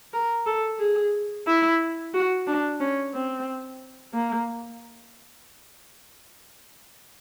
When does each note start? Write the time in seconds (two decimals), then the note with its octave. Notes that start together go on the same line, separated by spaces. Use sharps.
0.13 A#4
0.46 A4
0.80 G#4
1.47 E4
2.14 F#4
2.47 D4
2.80 C#4
3.14 C4
4.14 A#3